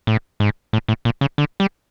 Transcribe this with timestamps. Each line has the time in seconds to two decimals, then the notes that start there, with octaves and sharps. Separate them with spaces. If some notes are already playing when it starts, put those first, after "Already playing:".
0.07 A2
0.40 G#2
0.73 A2
0.88 A2
1.05 A#2
1.21 C#3
1.38 D3
1.60 G3